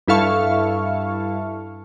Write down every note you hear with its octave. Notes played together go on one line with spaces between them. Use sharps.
G2 E4 A4 F5 C#6